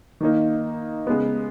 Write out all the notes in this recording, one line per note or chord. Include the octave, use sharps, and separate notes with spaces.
D#3 A#3 D#4
C#3 G#3 B3